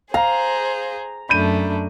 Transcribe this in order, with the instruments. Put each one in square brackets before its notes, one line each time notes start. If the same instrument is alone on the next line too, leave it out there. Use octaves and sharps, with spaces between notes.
[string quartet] G#4 C5 [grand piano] F5 [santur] A#5
[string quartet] F#2 A3 D4 [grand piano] B5 G6 D#7